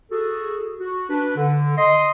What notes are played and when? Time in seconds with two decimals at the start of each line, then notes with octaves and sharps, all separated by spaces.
0.11 F#4 G#4 A4
0.80 F#4
1.10 D4 B4
1.37 D3
1.78 D#5 C6